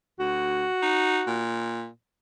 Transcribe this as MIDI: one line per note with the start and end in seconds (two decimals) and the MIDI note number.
0.20 0.66 38
0.20 1.44 66
0.83 1.20 63
1.27 1.88 46